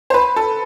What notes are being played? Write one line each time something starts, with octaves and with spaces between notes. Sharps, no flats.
C5
B4
A4